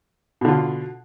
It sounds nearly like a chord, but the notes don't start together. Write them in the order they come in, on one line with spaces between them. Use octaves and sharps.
B2 D3 F4